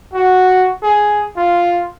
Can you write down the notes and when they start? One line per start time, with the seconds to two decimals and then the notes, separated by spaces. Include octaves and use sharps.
0.14 F#4
0.83 G#4
1.37 F4